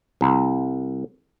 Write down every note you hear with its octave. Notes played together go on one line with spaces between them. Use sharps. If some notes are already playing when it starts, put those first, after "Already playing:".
C2